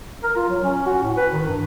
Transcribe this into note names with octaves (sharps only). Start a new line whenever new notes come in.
A#4
F4
F#3
C#4
F#4
A2
B4
D#3
G2